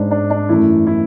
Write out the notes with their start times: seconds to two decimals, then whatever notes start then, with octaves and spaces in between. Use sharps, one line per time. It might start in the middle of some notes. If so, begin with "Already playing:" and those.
Already playing: G#2 G#3 C#4 D4
0.11 D4
0.30 D4
0.49 F#2 E3 A3 E4
0.87 E4